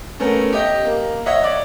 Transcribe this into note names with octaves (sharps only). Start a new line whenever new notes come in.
A3 B3 C#4 A#4
G4 D#5
A#3
C#5 D#5 E5 F#5
D5